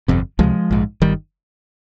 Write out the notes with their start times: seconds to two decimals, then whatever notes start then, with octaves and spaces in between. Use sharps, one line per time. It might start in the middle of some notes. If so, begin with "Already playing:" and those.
0.08 G1 F2 C3
0.39 C#2 C3 F3 G#3
0.71 A#1 G#2
1.02 G1 D#3 G3